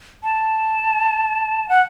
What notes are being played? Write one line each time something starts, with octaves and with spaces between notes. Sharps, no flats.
A5
F#5